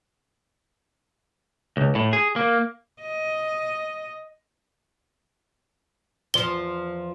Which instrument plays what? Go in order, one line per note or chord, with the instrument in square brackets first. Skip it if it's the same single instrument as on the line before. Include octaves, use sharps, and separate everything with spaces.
[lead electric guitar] C#2
A2
G#4
A#3
[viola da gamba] D#5
[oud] E2 F3 [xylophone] G7